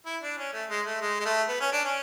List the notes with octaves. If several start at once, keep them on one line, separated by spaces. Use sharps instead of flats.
E4
D4
C#4
A3
G#3
A3
G#3
G#3
A3
B3
C#4
D4
C#4